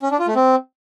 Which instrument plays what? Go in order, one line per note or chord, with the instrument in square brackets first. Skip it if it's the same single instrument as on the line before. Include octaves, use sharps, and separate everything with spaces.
[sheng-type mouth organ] C#4
D4
F4
A3
C4